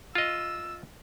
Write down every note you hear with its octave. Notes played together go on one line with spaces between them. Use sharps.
F4 D#5 E6